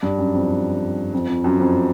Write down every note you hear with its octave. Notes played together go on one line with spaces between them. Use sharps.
G2
F#2
F2
F2
F2
F#2
F2